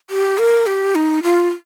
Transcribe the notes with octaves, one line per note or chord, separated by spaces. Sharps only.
G4
A#4
G4
D#4
F4